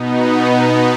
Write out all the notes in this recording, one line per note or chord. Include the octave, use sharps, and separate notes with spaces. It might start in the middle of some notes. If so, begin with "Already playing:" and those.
Already playing: B2 B3 D#4